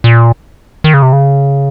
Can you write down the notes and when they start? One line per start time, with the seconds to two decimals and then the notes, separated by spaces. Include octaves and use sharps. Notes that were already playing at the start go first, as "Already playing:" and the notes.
0.04 A#2
0.84 D#3
0.94 C#3
1.02 C3
1.13 C#3